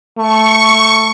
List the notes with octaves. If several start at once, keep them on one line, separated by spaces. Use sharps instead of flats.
A3 C#6